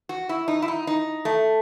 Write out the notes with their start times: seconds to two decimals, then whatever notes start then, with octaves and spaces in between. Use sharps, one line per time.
0.09 F#4
0.29 E4
0.48 D#4
0.62 E4
0.68 D#4
0.87 D#4
1.25 A3